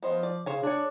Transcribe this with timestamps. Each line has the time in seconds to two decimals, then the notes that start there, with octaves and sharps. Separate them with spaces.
0.02 F3 B3 C5 D#5
0.23 D5
0.46 C#3 C5 C#5 G#5
0.63 D4 G#4 C#5